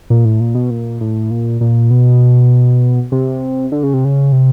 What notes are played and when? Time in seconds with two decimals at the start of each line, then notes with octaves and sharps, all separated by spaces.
0.10 A#2
0.25 A2
0.40 A#2
0.55 B2
0.71 A#2
1.01 A2
1.31 A#2
1.61 A#2
1.91 B2
3.12 C3
3.72 D3
3.83 C#3
3.94 C3
4.05 C#3
4.32 C3